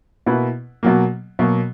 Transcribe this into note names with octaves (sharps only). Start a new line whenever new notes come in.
B2 A#3 E4 B4
B2 F#3 A#3
B2 F#3 A#3